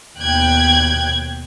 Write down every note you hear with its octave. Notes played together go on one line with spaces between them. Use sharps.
D#2 B2 G5 F#6 G#6